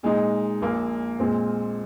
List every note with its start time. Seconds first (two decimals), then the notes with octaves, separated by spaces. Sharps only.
0.03 A#2 G#3 D#4
0.62 A#1 A#2 A#3
1.20 A#2 G#3 C4